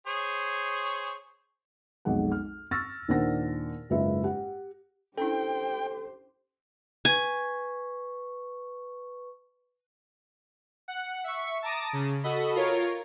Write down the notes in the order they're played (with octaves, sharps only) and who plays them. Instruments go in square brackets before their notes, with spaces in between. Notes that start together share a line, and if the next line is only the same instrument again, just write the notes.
[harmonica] G#4 C5 C#5
[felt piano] B1 F2 G#3 F#5
F6
C#6 E6 F6 A6 A#6
D#2 A#2 D4 C5 F#5 A#6
F#1 G#2 F4 B4 E5
G4 F#5
[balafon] C#4 D4 E4 [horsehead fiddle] G4 C5 [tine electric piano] A4 [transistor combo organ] G5
[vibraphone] B4 C#6 [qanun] G#5
[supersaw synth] F#5
E5 C#6
A5 A#5 D6 D#6
C#3
F#4 A4 D#5 B5
F4 A#4 C#5